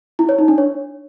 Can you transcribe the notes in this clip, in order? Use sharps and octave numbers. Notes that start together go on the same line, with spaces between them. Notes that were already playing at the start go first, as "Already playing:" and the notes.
E4
C#5
D#4
D4
C#5